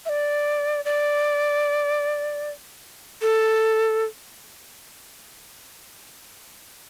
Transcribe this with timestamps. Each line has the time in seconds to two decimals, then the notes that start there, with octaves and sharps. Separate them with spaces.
0.06 E5
0.09 D5
0.85 D5
3.22 A4